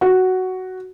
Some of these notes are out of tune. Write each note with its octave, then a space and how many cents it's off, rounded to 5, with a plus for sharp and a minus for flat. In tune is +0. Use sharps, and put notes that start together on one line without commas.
F#4 +5